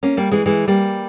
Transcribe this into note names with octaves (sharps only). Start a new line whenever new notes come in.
A#3 C#4
G3 A#3
E3 G#3
E3 G#3
G3 A#3